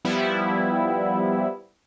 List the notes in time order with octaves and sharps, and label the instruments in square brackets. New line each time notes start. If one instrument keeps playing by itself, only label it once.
[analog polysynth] F3 G3 B3 E4